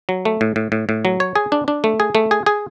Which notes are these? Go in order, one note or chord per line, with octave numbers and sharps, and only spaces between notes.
F#3
A3
A2
A2
A2
A2
F#3
C#5
G#4
D4
D4
A3
G#4
A3
G#4
G#4